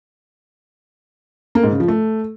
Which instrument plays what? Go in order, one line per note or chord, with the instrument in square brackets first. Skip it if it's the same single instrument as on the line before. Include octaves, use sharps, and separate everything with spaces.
[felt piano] A#3
G#2
C#3
F3
A3